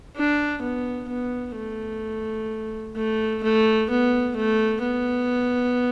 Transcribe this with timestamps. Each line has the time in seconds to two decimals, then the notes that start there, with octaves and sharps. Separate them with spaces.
0.16 D4
0.62 B3
1.09 B3
1.55 A3
2.96 A3
3.43 A3
3.90 B3
4.36 A3
4.83 B3